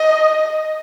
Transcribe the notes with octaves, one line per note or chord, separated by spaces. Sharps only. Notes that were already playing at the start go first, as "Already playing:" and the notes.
Already playing: D#5